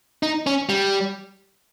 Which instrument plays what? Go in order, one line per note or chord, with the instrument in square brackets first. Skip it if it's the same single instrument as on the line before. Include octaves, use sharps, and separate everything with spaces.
[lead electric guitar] D#4
C#4
G3